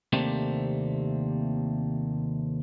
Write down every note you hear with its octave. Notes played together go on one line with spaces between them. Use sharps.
D#2 C3 A3 A#3 C4 D4